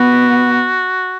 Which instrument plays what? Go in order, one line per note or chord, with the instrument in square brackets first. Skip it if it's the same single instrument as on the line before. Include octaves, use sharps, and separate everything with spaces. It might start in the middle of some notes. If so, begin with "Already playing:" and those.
Already playing: [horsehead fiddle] B3 [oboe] F#4